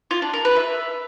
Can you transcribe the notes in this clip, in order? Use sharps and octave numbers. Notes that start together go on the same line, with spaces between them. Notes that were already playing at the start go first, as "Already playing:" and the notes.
F4
D4
A#4
B4
E5